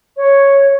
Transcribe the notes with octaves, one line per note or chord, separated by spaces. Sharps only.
C#5